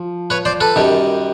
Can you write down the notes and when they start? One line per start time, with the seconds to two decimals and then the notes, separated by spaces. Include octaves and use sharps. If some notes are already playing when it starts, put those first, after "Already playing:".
Already playing: F3
0.30 B4 C#5
0.45 C5 D5
0.60 A4 B4
0.76 F#2 D#3 G3